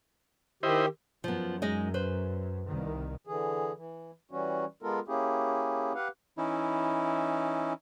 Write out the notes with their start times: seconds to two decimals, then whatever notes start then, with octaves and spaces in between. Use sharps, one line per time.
0.63 D#3 E4 G4 C5 D#5
1.24 F#2 F3 B3
1.62 G#3 D#4 D#5
1.94 B4 C5
2.66 C2 D#3
3.27 D3 E3 G#4
3.77 E3
4.31 E3 G3 C#4 F#4
4.83 G#3 B3 F4 A4 A#4
5.08 A#3 C#4 E4 G4 G#4
5.95 G4 B4 F5 F#5
6.38 E3 C#4 D#4 E4